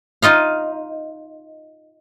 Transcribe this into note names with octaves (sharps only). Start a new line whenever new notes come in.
D#4 F4 D#5 F5